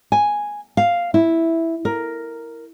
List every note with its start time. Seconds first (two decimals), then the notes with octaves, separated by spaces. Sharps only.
0.12 G#5
0.77 F5
1.14 E4
1.85 A#4